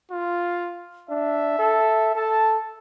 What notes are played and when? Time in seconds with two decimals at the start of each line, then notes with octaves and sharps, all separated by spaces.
0.11 F4
1.10 D4 E5
1.59 A4
2.16 A4 A5